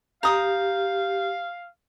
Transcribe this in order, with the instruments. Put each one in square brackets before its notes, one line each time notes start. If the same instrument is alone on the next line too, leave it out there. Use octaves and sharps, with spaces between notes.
[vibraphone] G4 [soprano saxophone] F5 [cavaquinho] A#5 D#6